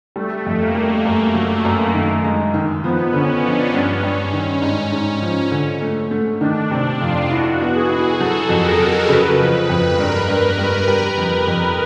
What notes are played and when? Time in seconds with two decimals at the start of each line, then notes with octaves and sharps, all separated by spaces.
0.16 G3 A3
0.46 F2
0.61 A#3
0.75 G3
1.05 F#2
1.35 F#3
1.65 F#2
1.94 D#3
2.24 G#3
2.54 D#3
2.84 F3 B3
3.13 D3 C#4
3.43 F3 D4
3.73 G2 C#4
4.03 G2
4.33 D#3
4.62 G#2 C#4
4.92 G#2
5.22 F3
5.51 D3
5.82 A3
6.11 A3
6.41 D#3 D4
6.71 C3
7.01 F2 F4
7.30 E4 F#4
7.61 B3
7.75 G#4
7.90 E4
8.20 F#3 A4
8.49 F2
8.64 A#4
8.80 F#3
9.09 C#3 B4
9.39 F3
9.69 F2
9.98 G2 A#4
10.28 G2
10.58 G2
10.88 G3
11.18 F2
11.48 F2